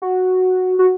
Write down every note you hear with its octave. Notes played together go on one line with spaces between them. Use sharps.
F#4
F#4